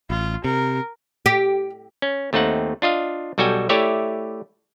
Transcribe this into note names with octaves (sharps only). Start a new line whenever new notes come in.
A1 F4
C3 A#4
G4
C#4
D#2 A3 C4 D#4 F#5
D4 F4 D#5 F5
B1 G3 F#4 A4 G5 G#5
A3 E4 G4 C#5 D5 E5